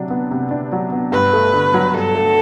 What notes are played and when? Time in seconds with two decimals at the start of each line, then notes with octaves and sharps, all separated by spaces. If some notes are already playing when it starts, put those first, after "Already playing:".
Already playing: C3 F#3 D4
0.10 B3
0.31 C3
0.51 D4
0.72 F#3
0.92 B3
1.12 G2 B4
1.33 A3
1.54 D3
1.74 F#3
1.94 G2 A4
2.15 A3